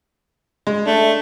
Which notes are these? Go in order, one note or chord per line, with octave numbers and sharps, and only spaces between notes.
G#3
A3 D4